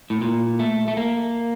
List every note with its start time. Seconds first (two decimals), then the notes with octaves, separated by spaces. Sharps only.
0.10 A2
0.21 A#2
0.59 A3
0.88 A3
0.97 A#3